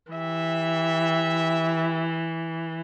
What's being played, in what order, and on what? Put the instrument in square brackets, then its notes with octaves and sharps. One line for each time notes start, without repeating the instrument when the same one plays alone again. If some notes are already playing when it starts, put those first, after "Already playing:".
[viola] E3 [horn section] G4 E5